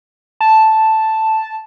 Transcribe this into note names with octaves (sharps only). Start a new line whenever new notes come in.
A5